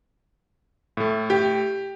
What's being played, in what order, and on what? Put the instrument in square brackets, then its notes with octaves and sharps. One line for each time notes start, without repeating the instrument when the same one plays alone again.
[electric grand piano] A2 A3
[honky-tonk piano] G4